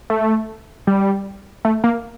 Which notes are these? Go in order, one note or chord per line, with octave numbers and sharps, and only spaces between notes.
A3
G3
A3
A#3